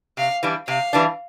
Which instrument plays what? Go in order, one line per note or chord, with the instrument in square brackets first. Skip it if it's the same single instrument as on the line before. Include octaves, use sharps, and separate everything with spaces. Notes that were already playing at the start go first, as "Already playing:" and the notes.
[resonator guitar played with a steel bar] C3 [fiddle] F5
[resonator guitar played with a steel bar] E3 G3 D4
[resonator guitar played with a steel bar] C3 [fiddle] F5
[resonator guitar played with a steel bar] E3 G3 D4